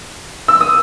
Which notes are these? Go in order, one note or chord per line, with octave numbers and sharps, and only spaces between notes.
E6
D#6